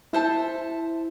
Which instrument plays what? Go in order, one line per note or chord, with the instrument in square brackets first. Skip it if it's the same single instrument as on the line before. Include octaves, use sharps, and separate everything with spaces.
[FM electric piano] E4 [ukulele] A4 C5 E5 A5